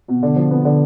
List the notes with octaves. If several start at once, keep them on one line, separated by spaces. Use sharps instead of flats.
B2
D3
F3
B3
D3